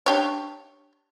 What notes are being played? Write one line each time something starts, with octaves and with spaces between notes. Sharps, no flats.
D4 G4 C#5